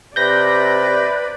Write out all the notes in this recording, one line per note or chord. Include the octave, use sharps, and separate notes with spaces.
C3 B4 D5 G6 A#6